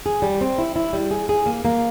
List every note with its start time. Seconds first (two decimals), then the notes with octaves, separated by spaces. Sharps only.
0.06 G#4
0.22 G3
0.41 C4
0.58 E4
0.76 E4
0.93 G3
1.11 G#4
1.29 G#4
1.46 A#3
1.65 A#3